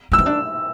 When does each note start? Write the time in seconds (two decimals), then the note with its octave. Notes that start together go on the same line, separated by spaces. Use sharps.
0.12 A3 E6
0.18 B3
0.26 D4